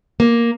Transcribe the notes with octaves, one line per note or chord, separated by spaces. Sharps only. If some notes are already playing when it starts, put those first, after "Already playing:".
A#3